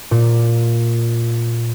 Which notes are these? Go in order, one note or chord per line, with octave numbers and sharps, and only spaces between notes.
A#2